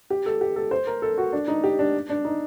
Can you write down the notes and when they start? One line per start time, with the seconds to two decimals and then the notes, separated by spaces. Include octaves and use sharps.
0.10 G4
0.26 A4
0.41 G4
0.56 A4
0.71 C5
0.87 A#4
1.02 A4
1.18 F#4
1.33 D4
1.48 D#4
1.64 G4
1.79 D4
2.10 D4
2.25 D#4